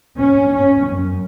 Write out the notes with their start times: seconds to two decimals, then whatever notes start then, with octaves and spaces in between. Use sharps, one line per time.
0.18 C#4
0.53 C#4
0.86 F#2